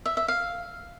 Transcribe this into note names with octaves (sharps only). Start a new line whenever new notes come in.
E5
E5
F5